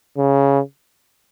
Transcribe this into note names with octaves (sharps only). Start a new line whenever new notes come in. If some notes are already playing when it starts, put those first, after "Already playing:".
C#3